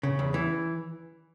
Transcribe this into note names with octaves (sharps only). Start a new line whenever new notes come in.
C#3
E2
E3